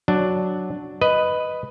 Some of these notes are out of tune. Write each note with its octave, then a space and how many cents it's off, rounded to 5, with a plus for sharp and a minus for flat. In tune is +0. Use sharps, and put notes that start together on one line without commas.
F#3 +0 D4 +0
B4 +5 D#5 +0